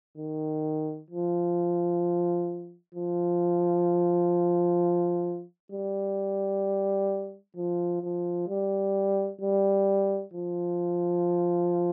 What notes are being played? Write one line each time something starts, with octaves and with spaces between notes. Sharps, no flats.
D#3
F3
F3
G3
F3
F3
G3
G3
F3